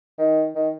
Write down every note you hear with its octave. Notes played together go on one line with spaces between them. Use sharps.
D#3
D#3